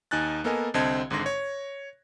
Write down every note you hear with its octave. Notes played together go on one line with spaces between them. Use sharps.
D#2 D#4 G#5 F#6 A6
A#3 B3 A4 A#4 D#5 G#5
C2 D3 C4 D#5 A5 G#6
G#1 G#2 D3 C6 A#6
C#5